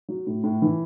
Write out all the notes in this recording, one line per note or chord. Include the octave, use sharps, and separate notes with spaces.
F#3
A2
A2
E3